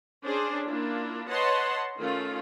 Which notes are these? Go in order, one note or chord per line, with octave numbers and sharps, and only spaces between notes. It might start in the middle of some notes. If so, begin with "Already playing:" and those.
C#4 D4 G#4 C5 D5
A#3 D4 E4 F4
B4 C#5 D#5 F#5 A5 C6
D#3 A3 C#4 F4